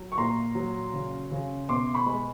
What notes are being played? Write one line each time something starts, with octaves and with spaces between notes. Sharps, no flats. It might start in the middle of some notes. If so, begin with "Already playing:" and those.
Already playing: F#3
C#6
A#2 A#5 C6
F#3
C#3
C#3
B2 C6 D6
B5 C#6
G#3